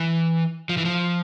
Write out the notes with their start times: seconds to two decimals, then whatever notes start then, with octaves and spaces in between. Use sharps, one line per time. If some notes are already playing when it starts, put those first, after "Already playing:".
Already playing: E3
0.69 F3
0.77 E3
0.85 F3